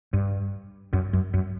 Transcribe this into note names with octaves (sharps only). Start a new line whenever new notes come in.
G2
F#2
F#2
F#2